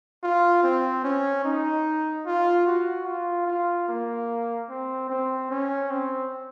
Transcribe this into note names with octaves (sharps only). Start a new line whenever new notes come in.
F4
C4
C#4
D#4
F4
F#4
F4
F4
A#3
C4
C4
C#4
C4